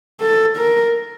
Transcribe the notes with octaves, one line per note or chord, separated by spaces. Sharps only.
A4
A#4